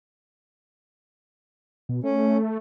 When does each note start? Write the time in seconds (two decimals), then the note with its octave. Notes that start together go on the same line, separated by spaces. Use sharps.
1.89 B2
2.04 A3 C#4